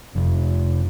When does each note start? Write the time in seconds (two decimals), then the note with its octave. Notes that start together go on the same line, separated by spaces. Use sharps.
0.15 F1 F2 C3